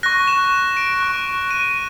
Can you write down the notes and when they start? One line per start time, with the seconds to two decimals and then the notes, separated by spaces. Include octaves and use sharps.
0.03 C#6 F#6 A#6
0.28 E7
0.77 D7
1.00 C#6 F#6
1.51 D#7